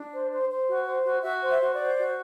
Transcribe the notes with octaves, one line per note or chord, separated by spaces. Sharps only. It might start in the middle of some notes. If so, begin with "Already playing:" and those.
Already playing: D4
C5
C5
C5
F#4
C5
F#4
F#4 E5
C5
E5
F#4
D5
C5
F#4